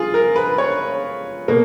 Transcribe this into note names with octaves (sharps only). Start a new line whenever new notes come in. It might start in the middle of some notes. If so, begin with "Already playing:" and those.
Already playing: F4 G#4
A#4
B4
C#5
B2 A#3